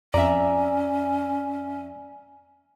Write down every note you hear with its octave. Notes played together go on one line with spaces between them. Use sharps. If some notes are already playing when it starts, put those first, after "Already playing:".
F2 C#4 D5 E5 A#5